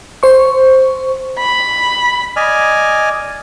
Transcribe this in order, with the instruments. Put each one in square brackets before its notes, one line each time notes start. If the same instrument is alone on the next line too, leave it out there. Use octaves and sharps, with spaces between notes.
[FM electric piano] C5 C#6
[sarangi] B5
[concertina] D5 D#5 G#5 F6